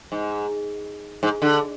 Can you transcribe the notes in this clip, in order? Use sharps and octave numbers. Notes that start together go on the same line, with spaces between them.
G#2
G#2
D3